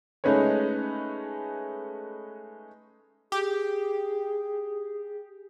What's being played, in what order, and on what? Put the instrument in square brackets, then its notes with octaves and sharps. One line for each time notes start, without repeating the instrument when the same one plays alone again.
[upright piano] G#3 A3 C#4 D#4 B4 C#5
[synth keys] G4 [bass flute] G#4